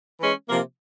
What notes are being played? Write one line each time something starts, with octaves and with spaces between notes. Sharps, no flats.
E3 G#3 C#4
C3 F3 A#3